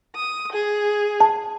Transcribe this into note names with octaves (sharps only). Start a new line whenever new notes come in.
D#6
G#4
A5